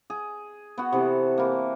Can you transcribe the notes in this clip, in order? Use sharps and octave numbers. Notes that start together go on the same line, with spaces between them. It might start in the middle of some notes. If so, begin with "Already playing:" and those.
G#4
B3 F#4
C3 E3 A4
E3 A#3